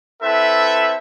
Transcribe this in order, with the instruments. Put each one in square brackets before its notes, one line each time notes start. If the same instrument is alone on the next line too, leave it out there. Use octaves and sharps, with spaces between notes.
[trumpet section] C4 E4 A4 B4 E5